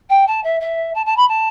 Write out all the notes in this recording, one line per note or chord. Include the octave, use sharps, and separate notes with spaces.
G5
A5
E5
E5
A5
A5
B5
A5